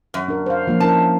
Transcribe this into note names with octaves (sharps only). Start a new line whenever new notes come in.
F#2
D4 A#4
C5 F5
F3 A#3 D4
C#4 E4 A#4 A5